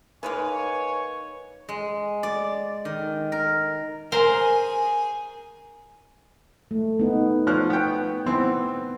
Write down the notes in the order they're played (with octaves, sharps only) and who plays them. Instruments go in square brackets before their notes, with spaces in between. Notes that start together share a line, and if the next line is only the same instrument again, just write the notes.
[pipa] D#3 G#3 A#3 [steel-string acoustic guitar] B4 [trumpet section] C#5 [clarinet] G#5
[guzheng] G#3
D5
D#3
A#4
[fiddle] G#4 G#5 [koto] A#4 C5
[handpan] A3
B3 D#4
[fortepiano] F3 F6 F#6 [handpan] C#5
[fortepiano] B3 G5
[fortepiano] E3 C4 [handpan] B3